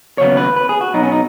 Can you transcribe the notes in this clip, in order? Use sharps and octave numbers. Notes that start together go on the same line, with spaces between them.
D#2 C#3 F#3 B3 C#5
B4
B4
G#4
F#4
B2 F#3 B3 D#4
C#4
D#4